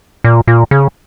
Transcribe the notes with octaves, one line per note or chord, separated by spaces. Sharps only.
A#2
A#2
C#3